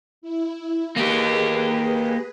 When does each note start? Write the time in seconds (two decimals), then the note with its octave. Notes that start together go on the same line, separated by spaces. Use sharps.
0.22 E4
0.96 A#3 G4 G#4 B4